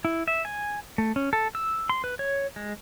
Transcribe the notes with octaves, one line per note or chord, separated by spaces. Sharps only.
E4
E5
G#5
A3
C#4
A4
E6
C6
B4
C#5
G#3